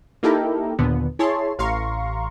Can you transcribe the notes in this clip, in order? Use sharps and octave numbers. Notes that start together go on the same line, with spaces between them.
A#3 D#4 E4 G4 A4 A#4
D#2 A#2 D3 B3
E4 G#4 C#5 A5 C6
A1 F5 A#5 C6 C#6